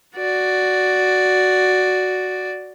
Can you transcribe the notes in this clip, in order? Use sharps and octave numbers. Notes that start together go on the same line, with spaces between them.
F#4 D5